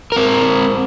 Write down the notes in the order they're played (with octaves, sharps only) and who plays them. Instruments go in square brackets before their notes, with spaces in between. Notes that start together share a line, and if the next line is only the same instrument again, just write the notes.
[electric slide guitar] C4 A#4